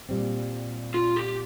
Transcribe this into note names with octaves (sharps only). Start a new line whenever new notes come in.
A#2 G3 C4
F4
G4